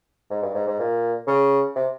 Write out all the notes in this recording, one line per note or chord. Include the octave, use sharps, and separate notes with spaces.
G#2
G2
G#2
G#2
A#2
C#3
C3